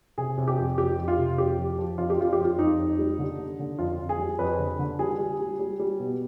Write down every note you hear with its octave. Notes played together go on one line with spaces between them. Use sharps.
C3 G#4
C3
G4
F2
F2 G4
F2
F4
C3
F2 G4
F3
F3
F2 F4
G4
F2 F4
G4
F2
F4
F2 D#4
F2
G3
D3
D3
D3
F2 F4
F2
G#4
G3
F2 B4
D3
D3
G3 G#4
G3
G3
G3
G3
B2